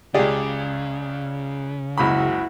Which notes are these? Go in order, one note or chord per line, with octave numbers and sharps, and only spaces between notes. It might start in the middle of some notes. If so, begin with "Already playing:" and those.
C#2 C#3 G4 G#4 D5
F#1 C#2 E4 F#4 B5